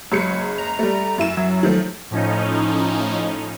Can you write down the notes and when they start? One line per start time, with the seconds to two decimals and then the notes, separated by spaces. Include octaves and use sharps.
0.12 F#1 F#3 G#3 C#7
0.58 A#5
0.79 G3 A3
1.18 F#2 E4 E7
1.37 F#3
1.63 D#3 F3 F#3 A3
2.11 A2 F3 C#4 D#4